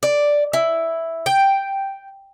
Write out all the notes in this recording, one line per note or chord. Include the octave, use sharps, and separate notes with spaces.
D5
E4
G5